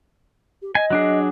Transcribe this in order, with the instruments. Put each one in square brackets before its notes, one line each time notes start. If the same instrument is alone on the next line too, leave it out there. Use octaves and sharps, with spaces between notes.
[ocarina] G4
[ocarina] D#5 [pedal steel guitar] G#5
[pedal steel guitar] F#3 D4 G#4